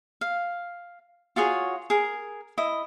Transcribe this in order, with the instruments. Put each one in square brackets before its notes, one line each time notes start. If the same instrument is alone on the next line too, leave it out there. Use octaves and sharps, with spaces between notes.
[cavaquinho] F5
F4 F#4 G#4 C#5
G#4 A#4
E4 D#5